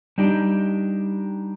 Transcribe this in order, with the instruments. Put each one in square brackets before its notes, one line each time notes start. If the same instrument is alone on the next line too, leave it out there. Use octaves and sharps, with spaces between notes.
[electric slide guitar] G3 D4 D#4 G4